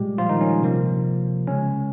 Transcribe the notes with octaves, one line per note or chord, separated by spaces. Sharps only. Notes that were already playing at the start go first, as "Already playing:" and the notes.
Already playing: A#2 G3 G#3 G4
F3 F4
D#3 D#4
C#4
C3 F3 A#3
C#3 G#3 C#4